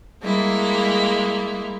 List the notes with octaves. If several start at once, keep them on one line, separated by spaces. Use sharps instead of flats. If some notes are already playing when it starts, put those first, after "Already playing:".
G3 G#3 A#3 E4